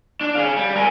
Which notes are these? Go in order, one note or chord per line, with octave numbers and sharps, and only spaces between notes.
D4
C#4 F5
G3
A#4 G#5